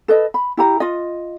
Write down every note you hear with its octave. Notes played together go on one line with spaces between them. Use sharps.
A4 B4 D#5
B5
E4 G4 A#5
F4 D#5